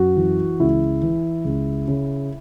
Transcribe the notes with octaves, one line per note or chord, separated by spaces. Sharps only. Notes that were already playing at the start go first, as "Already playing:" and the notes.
Already playing: F#2 F#4
E3
C#2 E4
E3
C#2
C#3